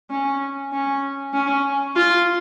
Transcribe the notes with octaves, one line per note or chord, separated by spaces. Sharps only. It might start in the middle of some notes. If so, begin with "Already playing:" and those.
C#4
C#4
C#4
F4